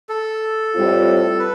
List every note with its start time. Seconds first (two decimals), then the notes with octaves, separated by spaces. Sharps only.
0.09 A4
0.74 A2 G3 C4 F4
1.39 B4